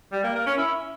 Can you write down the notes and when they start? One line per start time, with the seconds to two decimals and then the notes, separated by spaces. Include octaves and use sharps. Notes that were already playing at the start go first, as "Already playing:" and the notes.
0.12 G3
0.24 A#3
0.35 A#4
0.47 C#4
0.58 E4